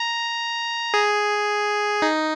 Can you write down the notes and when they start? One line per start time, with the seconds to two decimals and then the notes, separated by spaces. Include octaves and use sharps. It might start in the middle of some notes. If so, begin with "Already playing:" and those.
Already playing: A#5
0.94 G#4
2.02 D#4